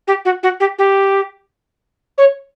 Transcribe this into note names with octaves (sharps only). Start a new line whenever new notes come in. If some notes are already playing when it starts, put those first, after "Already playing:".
G4
F#4
F#4
G4
G4
C#5